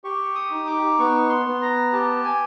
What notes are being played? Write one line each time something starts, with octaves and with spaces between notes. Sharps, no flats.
G4 C#6
D#6
D#4
D6
B3 C#6
C6
B3
A#5
G4 A5
G#5